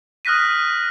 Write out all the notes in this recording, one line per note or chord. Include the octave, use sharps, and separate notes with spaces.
D#6 F6 F#6 A#6 B6 D#7